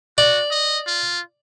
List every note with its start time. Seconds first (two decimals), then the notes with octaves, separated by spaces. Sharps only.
0.18 F#4 D5
0.51 D#5
0.87 F4